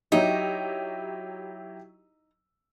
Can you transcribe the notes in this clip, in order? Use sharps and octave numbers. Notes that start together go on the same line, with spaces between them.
F#3 D#4 E4 G4